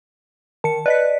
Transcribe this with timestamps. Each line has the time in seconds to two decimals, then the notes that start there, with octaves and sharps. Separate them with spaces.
0.64 D#3 A5 C#7
0.86 B4 D5 D#5 B6